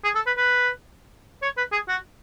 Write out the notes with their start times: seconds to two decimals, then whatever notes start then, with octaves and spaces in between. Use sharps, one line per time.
0.04 G#4
0.15 A4
0.26 B4
0.37 B4
1.42 C#5
1.57 B4
1.72 G#4
1.88 F#4